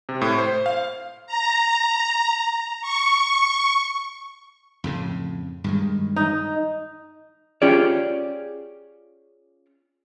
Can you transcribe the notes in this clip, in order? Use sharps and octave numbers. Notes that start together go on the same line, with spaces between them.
C3
A2
C5
F5
A#5
C#6
F2 A2 C#3
G2 D#3 G#3
D#4
C#4 F4 G4 G#4 D5